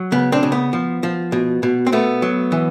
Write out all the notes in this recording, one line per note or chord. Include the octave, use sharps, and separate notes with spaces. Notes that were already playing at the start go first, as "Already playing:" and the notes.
Already playing: F#3
C#3 B3
C4 D4
C#3
B3
F3
F3
B2
B2
C4
A3 B3
F#3
E3